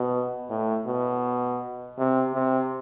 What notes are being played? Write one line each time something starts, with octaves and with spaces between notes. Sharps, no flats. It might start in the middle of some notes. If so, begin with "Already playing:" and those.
Already playing: B2
A2
B2
C3
C3